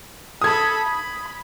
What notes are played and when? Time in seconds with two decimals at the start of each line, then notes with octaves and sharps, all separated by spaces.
0.41 A4 B5 D#6 G#6
0.87 B5